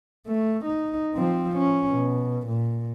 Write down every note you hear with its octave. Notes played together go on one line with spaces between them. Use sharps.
A3
D#4
F3 C4
C#4
B2
A#2